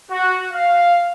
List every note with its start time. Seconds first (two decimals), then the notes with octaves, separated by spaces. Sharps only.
0.10 F#4
0.51 F5